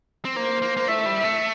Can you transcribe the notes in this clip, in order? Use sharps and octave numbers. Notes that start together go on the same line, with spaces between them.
C4
A#3 C5
A#3
A#3
A3 E5
G3
A3